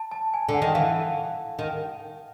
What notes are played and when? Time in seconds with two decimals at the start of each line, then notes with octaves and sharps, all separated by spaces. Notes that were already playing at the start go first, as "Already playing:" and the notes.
Already playing: A5
0.11 A5
0.34 G#5
0.49 D3
0.54 F#5
0.62 D#3
0.74 E3 F5
1.59 D#3